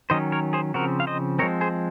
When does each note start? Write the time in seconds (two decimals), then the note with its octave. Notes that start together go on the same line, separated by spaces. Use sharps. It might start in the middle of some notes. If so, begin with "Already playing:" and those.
0.10 D#3 F#3 C#4 C5 D#5
0.32 A#4 C#5
0.53 G#4 C5
0.74 C#3 F3 C4 F#4 A#4
1.00 F5
1.07 C5 D#5
1.39 F3 G#3 C4 A#4 C#5
1.61 G#4 C5